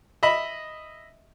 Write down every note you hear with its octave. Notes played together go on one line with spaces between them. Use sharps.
D#5 E5 B5